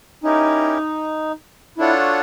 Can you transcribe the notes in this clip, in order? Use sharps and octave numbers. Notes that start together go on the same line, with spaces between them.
C#4 D#4 E4 G4 A#4
D4 E4 F4 A4 C#5 F#5
F#4